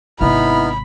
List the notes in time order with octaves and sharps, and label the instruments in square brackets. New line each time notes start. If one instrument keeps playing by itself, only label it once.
[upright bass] G#1 C3 [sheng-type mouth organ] B3 D#4 F6 [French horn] E4 [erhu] B5